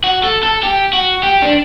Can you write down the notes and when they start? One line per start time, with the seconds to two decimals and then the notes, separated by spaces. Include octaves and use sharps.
0.04 F#4
0.24 A4
0.43 A4
0.63 G4
0.93 F#4
1.23 G4
1.42 D4